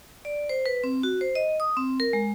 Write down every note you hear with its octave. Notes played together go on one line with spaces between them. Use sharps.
D5
C5
B4
C4
F#4
C5
D#5
D#6
C4
A#4
G#3